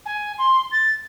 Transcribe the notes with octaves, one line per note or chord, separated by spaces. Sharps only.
G#5
C6
A6